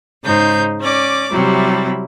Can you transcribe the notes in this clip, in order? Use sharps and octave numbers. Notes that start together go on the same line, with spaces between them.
G#2 C#3 D#4 C5 G6
C#4 D5 D6
C3 F#3 G3 E4